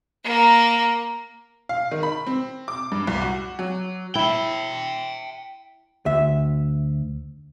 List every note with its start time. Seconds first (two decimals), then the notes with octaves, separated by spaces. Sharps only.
0.24 A#3 A#4
1.69 F5
1.91 D#3
2.03 B5
2.27 C4
2.68 D6
2.92 G2
3.07 C2
3.22 F#4
3.59 F#3
4.15 E4 E5 G5
6.06 D2 E5